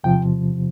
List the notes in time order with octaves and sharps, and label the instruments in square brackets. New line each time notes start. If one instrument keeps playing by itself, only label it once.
[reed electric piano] E2 C3 F3 G5